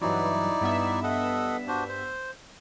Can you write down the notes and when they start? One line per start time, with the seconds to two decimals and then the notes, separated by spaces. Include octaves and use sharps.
0.01 G2 E3 F#3 D#4 E4 D5
0.61 G2 B3 E5
1.03 A4 D#5 F#5
1.68 D4 F#4 C5
1.89 C5